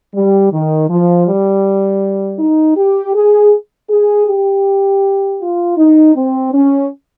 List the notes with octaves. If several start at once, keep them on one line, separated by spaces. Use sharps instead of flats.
G3
D#3
F3
G3
D#4
G4
G#4
G#4
G4
F4
D#4
C4
C#4